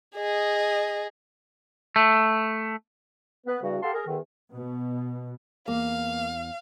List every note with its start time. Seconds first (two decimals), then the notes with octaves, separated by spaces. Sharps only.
0.16 G#4 D#5
1.96 A3
3.47 B3 B4
3.61 E2 G2 C#3 G3 F#4
3.82 G4 A4 F5 F#5 A5 C6
3.94 G#4 A#4
4.06 E2 D3 D#3
4.53 B2
5.68 E2 A#3 F5